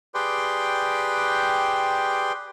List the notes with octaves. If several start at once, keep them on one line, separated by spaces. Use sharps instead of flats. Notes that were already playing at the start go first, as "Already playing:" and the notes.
G4 G#4 B4 D5 G5 C6